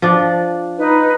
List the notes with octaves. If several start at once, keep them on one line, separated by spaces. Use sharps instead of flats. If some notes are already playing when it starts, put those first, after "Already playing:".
F3 D4
D#4 B4